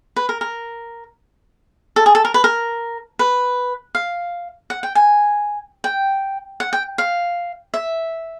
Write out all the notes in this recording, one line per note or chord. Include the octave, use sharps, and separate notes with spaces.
B4
A#4
A#4
A4
G#4
A4
A#4
B4
A#4
B4
F5
F#5
G5
G#5
G5
F#5
G5
F5
E5